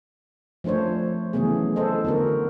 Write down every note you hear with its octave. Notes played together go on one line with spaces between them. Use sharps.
F3 A3 D4 C5 C#5
C#3 E3 F#3 A3 B3 G#4
A4 C5 D#5
D3 B3 F#4 A#4